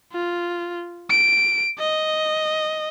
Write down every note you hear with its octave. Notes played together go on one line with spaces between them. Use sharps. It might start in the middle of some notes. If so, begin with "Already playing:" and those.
F4
D7
D#5